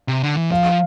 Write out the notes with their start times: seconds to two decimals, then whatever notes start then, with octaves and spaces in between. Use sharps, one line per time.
0.08 C3
0.23 D3
0.37 E3
0.51 F3 F5